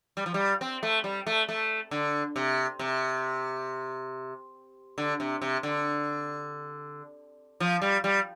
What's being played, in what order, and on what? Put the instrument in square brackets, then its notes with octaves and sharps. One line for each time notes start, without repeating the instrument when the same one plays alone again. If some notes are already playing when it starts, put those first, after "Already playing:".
[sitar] G3
F3
G3
C4
A3
G3
A3
A3
D3
C3
C3
D3
C3
C3
D3
F3
G3
G3